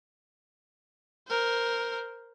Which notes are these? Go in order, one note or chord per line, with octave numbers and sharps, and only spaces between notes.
A#4 C5